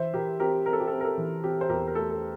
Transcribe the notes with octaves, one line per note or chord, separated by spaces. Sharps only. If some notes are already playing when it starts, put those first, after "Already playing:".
Already playing: E3 C5 E5
E3 G4 A#4
C4 G4 A#4
C4 A#4
A4
G4
C4 A4
A#4
A4
E3
C4 G4
C5
E2 G4 A#4
A#4
A3 A4
A4